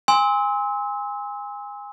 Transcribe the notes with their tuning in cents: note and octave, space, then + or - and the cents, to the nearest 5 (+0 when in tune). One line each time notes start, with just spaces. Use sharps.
G#5 -25 C6 +0 E6 -35